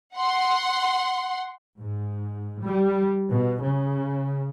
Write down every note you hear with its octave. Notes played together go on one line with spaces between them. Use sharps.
F#5 C6
G#2
G3
B2
C#3